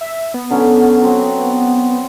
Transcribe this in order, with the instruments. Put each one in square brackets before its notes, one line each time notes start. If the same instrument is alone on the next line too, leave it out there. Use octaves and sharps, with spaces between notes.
[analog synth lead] E5
B3
[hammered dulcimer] D3 F#3 C#4
F#3 C4 F#4